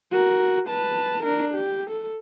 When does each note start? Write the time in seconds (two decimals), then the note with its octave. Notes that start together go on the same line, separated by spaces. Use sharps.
0.12 F#4 A#4
0.68 B4 A5
1.24 D4 A#4
1.55 G4
1.90 A4